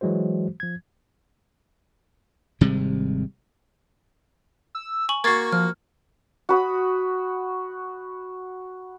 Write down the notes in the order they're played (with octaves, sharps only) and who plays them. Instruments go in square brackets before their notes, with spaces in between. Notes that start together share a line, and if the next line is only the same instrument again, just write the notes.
[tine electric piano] E3 F#3 G#3 F#4 C5
F3 G#6
[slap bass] G#1 C3 G3 G#3
[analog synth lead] E6
[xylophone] G#5 C#6 F#7
[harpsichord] A#3 F#4 [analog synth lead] C#6 [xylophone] G#6 A6 C7
[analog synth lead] F3 [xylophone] F6
[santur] F#4 B5 D#6